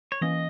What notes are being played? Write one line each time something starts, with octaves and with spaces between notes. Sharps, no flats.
C#5
E3 A#3 C#4 D#5